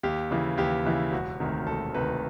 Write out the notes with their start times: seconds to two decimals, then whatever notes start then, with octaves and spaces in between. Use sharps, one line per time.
0.03 D#2 G4
0.31 C#3 E3
0.57 D#2 G4
0.85 C#3 E3
1.12 E1 F#4
1.40 D2 C3 D#3
1.66 E1 A4
1.94 D2 C3 D#3 B4